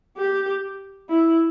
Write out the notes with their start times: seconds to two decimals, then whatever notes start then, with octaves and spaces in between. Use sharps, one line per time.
0.17 G4
1.10 E4